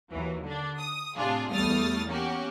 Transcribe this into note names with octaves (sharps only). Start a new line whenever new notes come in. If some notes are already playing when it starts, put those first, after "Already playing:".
D#2 E3 F#3
D3 D4
D#6
A2 C3 D4 F4 G#4
E2 G3 A3 D#6 F6 A6
A#3 C#4 F#4 G4